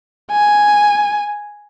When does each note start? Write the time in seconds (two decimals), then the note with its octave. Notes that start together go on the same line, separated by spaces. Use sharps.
0.32 G#5